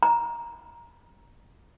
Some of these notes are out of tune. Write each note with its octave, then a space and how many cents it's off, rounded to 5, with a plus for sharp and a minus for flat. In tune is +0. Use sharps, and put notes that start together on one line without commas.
A#5 +15